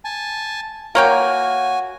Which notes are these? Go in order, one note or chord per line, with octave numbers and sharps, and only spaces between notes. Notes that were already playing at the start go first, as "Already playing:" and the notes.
G#5 A5
A#3 F#4 C#5 G5 G#5